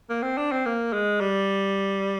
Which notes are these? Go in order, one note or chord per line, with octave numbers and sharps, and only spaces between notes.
A#3
C4
D4
C4
A#3
G#3
G3